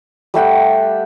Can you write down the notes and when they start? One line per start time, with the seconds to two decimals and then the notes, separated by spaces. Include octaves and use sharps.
0.34 G3 A3 G4 F#5